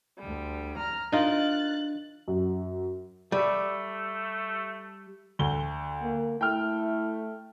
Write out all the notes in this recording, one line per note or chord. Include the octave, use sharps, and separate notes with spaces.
D2 G3
A#5 F6
D4 D#4 F4 A#4 F#6 A6
F#2
G3 A3
D2 D3 G7
A#3
A3 E4 G5 F6